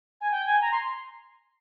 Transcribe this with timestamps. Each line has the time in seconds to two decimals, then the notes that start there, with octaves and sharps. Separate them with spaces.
0.21 G#5
0.31 G5
0.46 G#5
0.61 A#5
0.72 C6